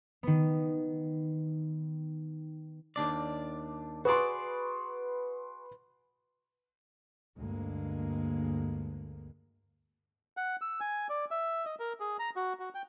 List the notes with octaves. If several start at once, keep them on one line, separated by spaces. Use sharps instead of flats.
D#3 B3
D#2 D4 D5
F#4 G#4 B4 D5 C6
D2 G2 G#3 A#3
F#5
E6
G#5
D5
E5
D#5
A#4
G#4
A#5
F#4
F#4
G5